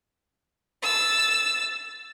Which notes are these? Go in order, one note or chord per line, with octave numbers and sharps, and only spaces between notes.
E6 A6